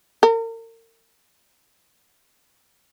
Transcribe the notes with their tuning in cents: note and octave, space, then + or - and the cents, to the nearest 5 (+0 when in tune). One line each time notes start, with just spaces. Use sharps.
A#4 -40